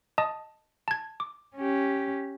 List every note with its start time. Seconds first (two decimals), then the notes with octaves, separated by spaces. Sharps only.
0.18 D#5 A5 D#6
0.88 A5 G#6
1.20 D6
1.56 C#4 G4